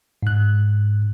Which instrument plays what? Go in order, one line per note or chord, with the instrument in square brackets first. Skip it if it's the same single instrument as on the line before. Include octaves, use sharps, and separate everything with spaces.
[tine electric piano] G#2 F#6